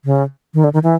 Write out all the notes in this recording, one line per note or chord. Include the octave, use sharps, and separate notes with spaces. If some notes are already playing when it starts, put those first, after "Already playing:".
C#3
D#3
D3
D#3
E3